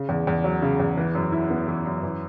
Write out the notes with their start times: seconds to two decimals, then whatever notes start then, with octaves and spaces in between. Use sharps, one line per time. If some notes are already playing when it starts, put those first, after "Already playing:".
Already playing: C#3
0.09 E2
0.27 E2
0.44 F#3
0.62 C#3
0.80 E2
0.97 E3
1.15 F#2
1.32 E4
1.50 B3
1.68 E3
1.86 F#2
2.03 E3